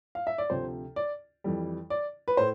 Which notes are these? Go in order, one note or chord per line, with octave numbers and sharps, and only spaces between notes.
F5
E5
D5
D2 C3 F3 C5
D5
F2 E3 G3
D5
B4
A2 C5